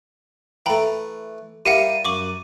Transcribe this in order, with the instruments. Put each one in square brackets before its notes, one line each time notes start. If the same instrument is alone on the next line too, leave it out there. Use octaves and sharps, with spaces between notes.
[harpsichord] E3 A3 [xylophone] G5 A#5 B5
[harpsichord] G3 E4 A#4 [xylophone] G4 F5 F#5 [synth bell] D#7
[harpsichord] F#2 [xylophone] C#6 D6 F#7